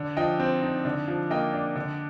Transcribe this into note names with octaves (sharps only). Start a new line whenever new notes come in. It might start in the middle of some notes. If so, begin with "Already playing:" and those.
Already playing: D3
F3 D#5 G5
C4
D#4
D3
F3
A#3 D#5 G5
D4
D3